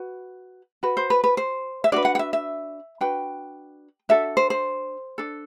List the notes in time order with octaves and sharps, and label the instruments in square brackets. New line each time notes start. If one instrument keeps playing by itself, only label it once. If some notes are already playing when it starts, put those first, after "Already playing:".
Already playing: [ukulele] F#4 B4
F#4 B4
C5
B4
B4
C5
E5
D4 F#4 B4 D5
F#5
F#5
E5
E5
D4 F#4 B4 G5
D4 F#4 A4 E5
C5
C5
D4 A4